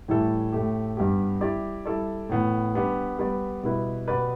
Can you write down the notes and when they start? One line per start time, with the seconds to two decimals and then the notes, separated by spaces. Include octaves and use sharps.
0.08 A2 E3 G3 E4 A4
0.53 A2 A3 G4
0.97 G2 G3 B3 G4
1.41 G3 E4 G4 D5
1.86 G3 E4 A4 D5
2.29 A2 E3 B3
2.75 G3 B3 D4 G4 B4
3.18 G3 B3 G4 B4 D5
3.63 B2 G3 E4 B4
4.08 B2 B3 G4 B4 D5